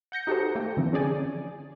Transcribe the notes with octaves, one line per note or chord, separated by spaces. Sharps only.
F#5 G6 A#6 C#7
D#4 F#4 G4 A4 C5
A3 A#3 A4 G5
D3 E3 F3 C4
C#4 G#4 D5 G#5